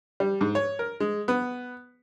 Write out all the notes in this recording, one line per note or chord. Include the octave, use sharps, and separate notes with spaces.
G3
G#2
C#5
A#4
G#3
B3